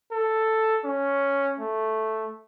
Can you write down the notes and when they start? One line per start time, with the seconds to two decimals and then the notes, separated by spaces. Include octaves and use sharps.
0.12 A4
0.85 C#4
1.60 A3